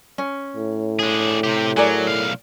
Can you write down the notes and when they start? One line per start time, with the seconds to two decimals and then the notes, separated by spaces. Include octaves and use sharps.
0.18 C#4
0.56 A2
0.99 D4 G#4
1.44 C3 G4
1.77 F#3 G#4 A#4 D5
2.07 B1 F5